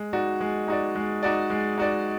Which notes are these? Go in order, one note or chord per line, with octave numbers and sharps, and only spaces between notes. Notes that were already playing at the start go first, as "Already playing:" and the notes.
Already playing: G#3
D#4 F#4 D5
G#3
D#4 F#4 D5
G#3
D#4 F#4 D5
G#3
D#4 F#4 D5